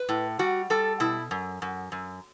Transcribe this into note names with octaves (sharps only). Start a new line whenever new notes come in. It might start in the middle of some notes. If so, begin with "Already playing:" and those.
Already playing: B4
A2
G3 F#4
G3 A4
B2 E4
F#2
F#2
F#2